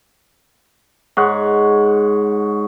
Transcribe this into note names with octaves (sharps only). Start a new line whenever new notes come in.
G#2 C#5 F#5